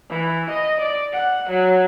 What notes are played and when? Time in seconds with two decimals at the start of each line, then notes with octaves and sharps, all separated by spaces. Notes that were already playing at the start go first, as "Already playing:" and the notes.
0.10 E3
0.50 D#5
0.81 D5
1.13 F#5
1.50 F#3